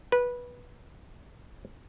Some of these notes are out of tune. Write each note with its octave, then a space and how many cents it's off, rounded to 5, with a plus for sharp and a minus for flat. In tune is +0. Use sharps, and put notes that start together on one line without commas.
B4 -15